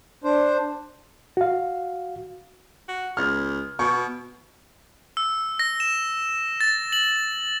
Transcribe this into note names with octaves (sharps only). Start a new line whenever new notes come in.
D4 C5
F#4 F5
F#4
C#2 F6
B2 C#6
E6
A#6
E7
A6
F#7